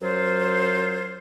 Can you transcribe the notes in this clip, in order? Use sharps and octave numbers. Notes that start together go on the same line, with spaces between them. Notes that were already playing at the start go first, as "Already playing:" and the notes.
F#2 F#3 F4 C5